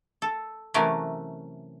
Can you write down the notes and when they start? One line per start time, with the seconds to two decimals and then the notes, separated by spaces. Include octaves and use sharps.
0.22 A4
0.74 C3 E3 F#3 A3 C#4 A#4